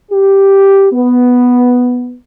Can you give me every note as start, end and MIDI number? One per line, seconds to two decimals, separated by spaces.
0.12 0.87 67
0.93 2.15 59